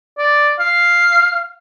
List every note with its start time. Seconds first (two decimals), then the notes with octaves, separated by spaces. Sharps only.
0.18 D5
0.59 F5